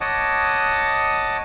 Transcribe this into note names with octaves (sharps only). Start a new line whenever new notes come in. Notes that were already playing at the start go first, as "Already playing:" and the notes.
C#5 D#5 F#5 A5 D6 D#6